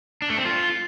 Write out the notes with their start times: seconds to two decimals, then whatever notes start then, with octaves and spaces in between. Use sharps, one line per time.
0.22 D4
0.30 A3
0.38 C4
0.45 F4